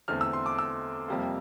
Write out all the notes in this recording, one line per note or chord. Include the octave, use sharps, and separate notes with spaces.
E2 D3 A3 C4 F6
E6
C6
D6
E6
F2 C3 G3 A#3